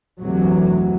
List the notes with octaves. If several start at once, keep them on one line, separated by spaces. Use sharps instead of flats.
F1 D2 C3 E3 F#3